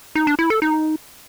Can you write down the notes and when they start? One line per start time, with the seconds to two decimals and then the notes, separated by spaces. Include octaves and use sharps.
0.15 D#4
0.27 D4
0.39 E4
0.50 A4
0.62 D#4